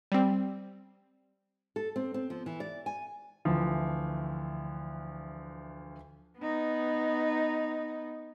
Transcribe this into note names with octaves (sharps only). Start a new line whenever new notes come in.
G3 C4
A4
C4
C4
F3
E3
D5
G#5
D2 E3 F3
B3 D#4